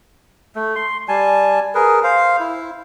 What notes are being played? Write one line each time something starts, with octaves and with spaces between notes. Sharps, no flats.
A3
C6
G3 G#5 A5
G#4 A#4 B4
C5 F5
E4